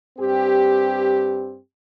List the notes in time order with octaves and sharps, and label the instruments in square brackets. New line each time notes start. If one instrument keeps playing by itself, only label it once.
[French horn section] G2 C4 G4